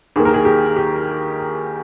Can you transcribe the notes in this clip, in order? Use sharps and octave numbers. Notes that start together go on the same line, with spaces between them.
D#2 D#3 A#3 G#4
A#4
G#4
G4
G4